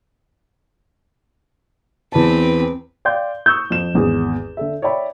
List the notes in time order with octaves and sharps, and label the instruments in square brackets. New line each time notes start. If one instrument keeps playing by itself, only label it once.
[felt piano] E2 A5 [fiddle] C4 B4
[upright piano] D5 F5 G5 C6 G6
C#6 D#6 E6 G6
F2 E7
G#1 E2 D#6
D3 A4 E5
C#5 D5 E5 G5 B5